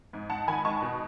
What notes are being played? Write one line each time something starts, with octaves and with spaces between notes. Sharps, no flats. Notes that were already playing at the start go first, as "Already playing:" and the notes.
G#2
G#2 F#5 A5
D#3 G#5 B5
G#3 A5 C#6
B2